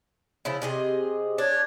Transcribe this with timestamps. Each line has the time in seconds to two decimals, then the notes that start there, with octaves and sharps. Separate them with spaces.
0.45 C#3 F3 E4
0.62 C3 G#4 D#5
1.38 D4 C#5